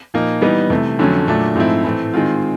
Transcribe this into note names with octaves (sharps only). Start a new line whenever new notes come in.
A#2 F3 A#3 D#4
E3 G3 B3 D#4
C3 E3 A3
F2 D3 F#3 A3 C#4
A#2 F#3 A3 D4
G#2 F3 A3 C4 E4
A2 E3 A3 C4
D#3 G#3 C4 F4